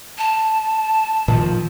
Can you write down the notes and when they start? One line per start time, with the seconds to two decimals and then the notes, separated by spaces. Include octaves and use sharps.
0.18 A5
1.28 A#2 D#3 F3